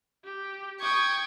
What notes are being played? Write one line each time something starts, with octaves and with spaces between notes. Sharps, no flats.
G4
G5 C#6 D#6 G#6